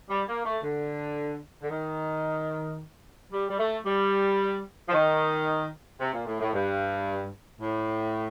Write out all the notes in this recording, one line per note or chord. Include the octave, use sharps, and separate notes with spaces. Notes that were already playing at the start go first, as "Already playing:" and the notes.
G3
A#3
A3
D3
D3
D#3
G3
G3
A3
G3
F3
D#3
C3
A#2
A2
A2
G2
A2